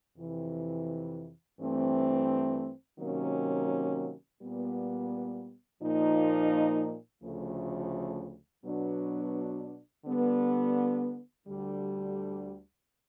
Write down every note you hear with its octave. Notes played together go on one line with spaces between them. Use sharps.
F2 C3 E3
G2 E3 A3 C4
C3 D#3 F#3 A#3 C#4
A#2 G3 B3
A#2 F3 A#3 D#4
D2 C#3 F3 A3
B2 F#3 B3 D4
D3 G3 B3
D2 D3 G3